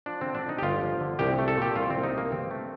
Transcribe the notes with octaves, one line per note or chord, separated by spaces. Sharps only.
F3 D4
D3 C4
D4
F2 D#4
G4
G1 F4
F3
D3
C2 G4
A3
A4
A#2 G4
C2 F4
C2 C4
D#4
A3 A#3
G2 C4
A3